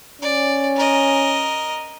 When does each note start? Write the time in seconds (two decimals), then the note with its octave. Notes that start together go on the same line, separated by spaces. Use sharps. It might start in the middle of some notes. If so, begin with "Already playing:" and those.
0.22 C#4 D5
0.76 A#4 D#5